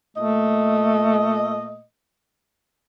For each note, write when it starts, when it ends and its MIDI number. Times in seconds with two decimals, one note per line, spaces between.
0.17 1.81 46
0.17 1.81 57
0.17 1.81 75